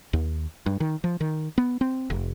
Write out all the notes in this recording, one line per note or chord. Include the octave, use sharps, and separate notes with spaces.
D#2
G2
D#3
F3
D#3
B3
C4
F1